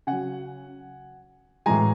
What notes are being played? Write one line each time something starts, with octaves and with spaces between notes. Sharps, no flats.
C#3 F#3 F#5 G#5
A2 E3 G#3 G#5 A#5